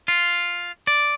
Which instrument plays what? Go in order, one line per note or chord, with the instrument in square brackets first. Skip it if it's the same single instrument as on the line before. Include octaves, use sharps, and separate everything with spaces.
[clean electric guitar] F4
D5